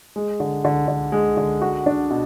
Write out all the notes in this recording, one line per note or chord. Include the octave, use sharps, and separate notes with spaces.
G#3
D3
D3
D3
G#3
D3
F#4
D4
B2